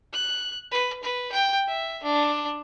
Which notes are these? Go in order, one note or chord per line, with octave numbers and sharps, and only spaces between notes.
F#6
B4
B4
G5
E5
D4